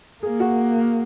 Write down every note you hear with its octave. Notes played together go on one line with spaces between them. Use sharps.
A#3 G#4
F#4